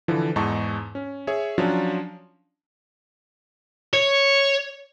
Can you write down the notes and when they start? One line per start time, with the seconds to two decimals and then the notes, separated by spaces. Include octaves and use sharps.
0.08 D3 E3 F3
0.36 E2 G#2 D#4 A5 C#6
0.95 C#4
1.27 G#4 C#5 E5
1.58 F3 F#3 C#4 D4 F4
3.93 C#5